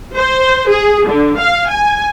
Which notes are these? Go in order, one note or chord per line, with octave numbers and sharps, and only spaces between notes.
C5
G#4
D3
F5
G#5